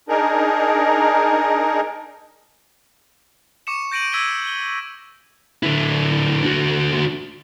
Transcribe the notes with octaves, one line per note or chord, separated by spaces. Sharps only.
D4 D#4 G#4 A#4
C#6 D6 C#7 E7
G6 A#6 D7 D#7 F#7
E6 G#6 B6 D#7 G7
G7
D3 E4
D3 F#4